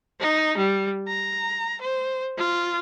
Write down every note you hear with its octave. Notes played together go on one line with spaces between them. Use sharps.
D#4
G3
A#5
C5
F4